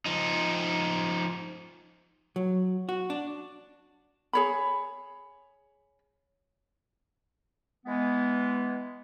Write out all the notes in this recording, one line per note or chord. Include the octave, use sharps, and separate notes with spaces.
F3 D#4
F#3
F#4
D4
G#4 C#5 B5
E3 G#3 B3